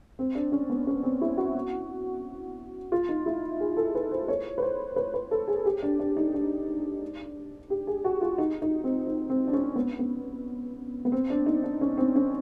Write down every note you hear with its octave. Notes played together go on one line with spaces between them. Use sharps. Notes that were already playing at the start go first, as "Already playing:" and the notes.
C4
D4
C#4
B3
C#4
C4
E4
F#4
F4
D#4
E4
G#4
A4
B4
C5
C#5
B4
C5
B4
B4
A4
G#4
G4
D4
D4
D#4
D4
G4
G#4
F#4
F4
D#4
D#4
C4
D#4
C4
D4
C#4
B3
B3
B3
C4
D4
D#4
D4
C#4
C4
C#4